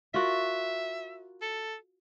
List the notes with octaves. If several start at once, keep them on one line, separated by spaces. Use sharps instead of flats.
F4 F#4 A#4 E5
A4